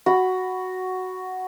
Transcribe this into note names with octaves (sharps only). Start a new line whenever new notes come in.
F#4 B5